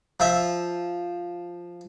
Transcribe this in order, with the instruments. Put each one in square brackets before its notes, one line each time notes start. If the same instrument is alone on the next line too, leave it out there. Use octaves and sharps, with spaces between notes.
[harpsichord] F3 E5